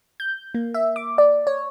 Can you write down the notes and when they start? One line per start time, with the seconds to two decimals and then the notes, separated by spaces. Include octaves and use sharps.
0.20 G6
0.55 A#3
0.74 E5
0.96 D6
1.18 D5
1.47 C#5